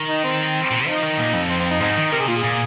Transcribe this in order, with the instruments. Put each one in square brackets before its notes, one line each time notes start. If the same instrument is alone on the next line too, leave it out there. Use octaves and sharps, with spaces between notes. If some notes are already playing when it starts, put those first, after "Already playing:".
Already playing: [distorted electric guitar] D#3
[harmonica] D#4
C4
[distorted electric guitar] A#2
[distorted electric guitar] F3 [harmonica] D#4
[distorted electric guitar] D#3
A#2
F2
[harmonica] C4
C4
D#4
[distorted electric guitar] G#2 [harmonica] G#3 C4 D#4
[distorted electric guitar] D#3
[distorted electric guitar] C3 [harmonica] A#4
[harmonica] G#4
[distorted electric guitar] A#2 [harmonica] F4
[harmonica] G#4
[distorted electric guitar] A#2